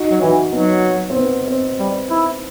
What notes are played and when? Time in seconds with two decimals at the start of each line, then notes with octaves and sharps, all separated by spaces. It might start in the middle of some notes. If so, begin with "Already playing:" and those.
Already playing: D#4 F#4
0.11 F#3
0.21 E3 D#4 F#4
0.52 F#3 B3 D#4
1.10 C4
1.16 B3
1.47 C4
1.79 G3
2.10 E4